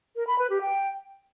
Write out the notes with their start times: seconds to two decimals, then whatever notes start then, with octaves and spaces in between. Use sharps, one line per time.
0.16 A#4
0.27 B5
0.39 B4
0.50 G4
0.61 G5